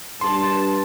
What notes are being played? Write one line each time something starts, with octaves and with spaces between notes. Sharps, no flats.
G2 A5 C6